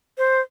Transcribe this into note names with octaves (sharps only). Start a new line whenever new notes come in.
C5